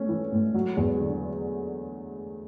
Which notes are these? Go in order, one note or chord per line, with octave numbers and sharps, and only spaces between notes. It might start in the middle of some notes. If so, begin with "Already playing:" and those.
Already playing: A3 C#4
E3
A2
F#3
E2
D3